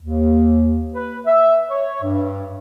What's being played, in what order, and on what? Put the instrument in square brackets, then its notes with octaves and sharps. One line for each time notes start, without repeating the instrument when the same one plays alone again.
[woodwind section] D#2
B4
E5
C#5
G2